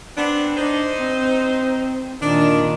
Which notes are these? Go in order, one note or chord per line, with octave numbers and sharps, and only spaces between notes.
B3 C4 D4
D4 D#4 C5
C4
A#2 D#3 D4